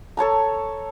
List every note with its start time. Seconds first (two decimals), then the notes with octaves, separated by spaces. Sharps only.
0.17 A4 C#5 A5 A#5